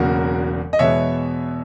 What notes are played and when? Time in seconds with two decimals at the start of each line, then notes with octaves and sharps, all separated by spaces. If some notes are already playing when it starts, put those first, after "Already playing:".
Already playing: E1 E2 C#3 F#3 A#3 F#4 A#4
0.73 D#5
0.79 E2 B2 G#3 B3 C#5 E5